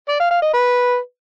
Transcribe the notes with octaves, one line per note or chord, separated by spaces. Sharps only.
D5
F5
F5
D#5
B4